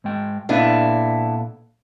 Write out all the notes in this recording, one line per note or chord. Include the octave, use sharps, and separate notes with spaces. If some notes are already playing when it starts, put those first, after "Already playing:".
G#2 G#3 G5
A#2 B3 D4 E4 A4 F5